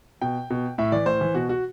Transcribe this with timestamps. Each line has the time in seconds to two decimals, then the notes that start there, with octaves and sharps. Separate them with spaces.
0.22 B2 G5
0.50 B2
0.78 A2 E5
0.92 E3 D5
1.06 A2 C5
1.21 E3
1.35 B2 F#4
1.49 F#4